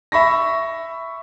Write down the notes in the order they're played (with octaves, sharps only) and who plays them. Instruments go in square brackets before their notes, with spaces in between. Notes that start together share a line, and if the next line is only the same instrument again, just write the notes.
[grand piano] E5 B5 C#6 A#6